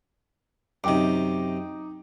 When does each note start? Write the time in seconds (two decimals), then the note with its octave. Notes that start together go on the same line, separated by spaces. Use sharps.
0.84 F#2 C3 D#4 G5 D6